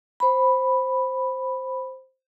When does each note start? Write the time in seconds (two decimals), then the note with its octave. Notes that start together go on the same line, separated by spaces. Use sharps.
0.20 C5 B5